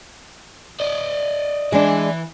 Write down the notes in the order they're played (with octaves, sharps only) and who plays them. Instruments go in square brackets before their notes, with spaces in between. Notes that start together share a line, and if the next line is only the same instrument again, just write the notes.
[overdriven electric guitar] D5 D#5
[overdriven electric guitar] E3 E5 [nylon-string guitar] G#3 D4